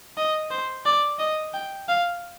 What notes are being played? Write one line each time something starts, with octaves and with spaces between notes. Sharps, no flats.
D#5
C5
D5
D#5
G5
F5